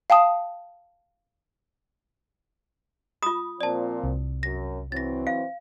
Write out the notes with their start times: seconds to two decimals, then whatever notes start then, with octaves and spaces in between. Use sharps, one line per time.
0.10 F5 G5 A5 D#6
3.23 F4 B5 D#6
3.61 A#2 F3 C4 D5 A5
4.03 C2
4.43 F#2 A#6
4.92 E3 F#3 C4 A6 A#6
5.27 F5